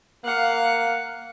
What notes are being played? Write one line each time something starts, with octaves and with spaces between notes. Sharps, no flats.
A#3 F5 F#5